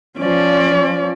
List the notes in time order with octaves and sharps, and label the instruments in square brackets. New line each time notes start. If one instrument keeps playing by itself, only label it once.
[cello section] F3 [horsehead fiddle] C#4 D5